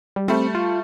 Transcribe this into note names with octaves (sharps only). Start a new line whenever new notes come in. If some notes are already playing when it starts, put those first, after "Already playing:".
G3
G3 A3 C4
F4